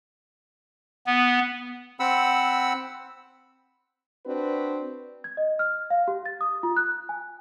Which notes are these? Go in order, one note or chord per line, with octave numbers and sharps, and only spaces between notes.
B3
C4 F#5 B5 E6
C4 D4 F#4 B4
G#6
D#5
F6
F5
G4
A6
D#6
F4
F#6
G#5